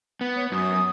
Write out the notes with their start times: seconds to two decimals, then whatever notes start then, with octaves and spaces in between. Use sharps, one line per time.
0.21 B3
0.36 C#5
0.52 F#2 D#6